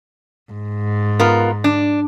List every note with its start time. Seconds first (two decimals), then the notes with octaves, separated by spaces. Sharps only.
0.51 G#2
1.19 B3 F4 A#4
1.64 D4